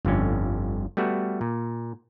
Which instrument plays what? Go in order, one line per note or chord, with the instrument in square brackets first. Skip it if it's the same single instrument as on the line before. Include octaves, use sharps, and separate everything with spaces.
[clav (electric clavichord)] G1 F2 D3 C#4
G3 A3 B3 F#4
A#2